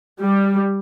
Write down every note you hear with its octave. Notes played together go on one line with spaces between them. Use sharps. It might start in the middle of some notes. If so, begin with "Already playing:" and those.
G3